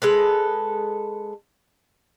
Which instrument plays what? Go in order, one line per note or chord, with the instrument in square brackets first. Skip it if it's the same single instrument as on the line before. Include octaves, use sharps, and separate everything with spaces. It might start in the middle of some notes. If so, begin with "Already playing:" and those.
[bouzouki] G#3 A4 B4